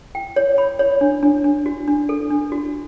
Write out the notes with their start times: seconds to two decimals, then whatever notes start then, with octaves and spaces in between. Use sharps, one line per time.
0.15 G5
0.36 C#5
0.58 B5
0.79 C#5
1.01 D4
1.23 D4
1.44 D4
1.66 F#4
1.88 D4
2.09 A4
2.30 D4
2.52 F#4